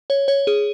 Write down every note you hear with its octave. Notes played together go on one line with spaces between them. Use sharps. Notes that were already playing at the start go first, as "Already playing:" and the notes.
C#5
C#5
G#4